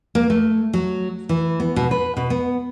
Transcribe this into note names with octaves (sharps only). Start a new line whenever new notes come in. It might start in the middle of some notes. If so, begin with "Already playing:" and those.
A#3
A3
F#3
E3
B3
B2
B4
B2
B3